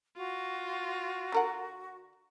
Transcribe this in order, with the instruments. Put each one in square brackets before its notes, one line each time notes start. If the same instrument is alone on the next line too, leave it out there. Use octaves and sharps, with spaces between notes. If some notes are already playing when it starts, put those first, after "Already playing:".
[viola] F4 [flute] F#4
[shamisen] D3 A#4 F#5